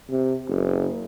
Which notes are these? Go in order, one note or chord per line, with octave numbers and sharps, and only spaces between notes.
C3
F#1